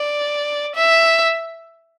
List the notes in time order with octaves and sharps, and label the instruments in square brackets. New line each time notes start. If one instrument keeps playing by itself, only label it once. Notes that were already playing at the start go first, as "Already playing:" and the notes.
Already playing: [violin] D5
E5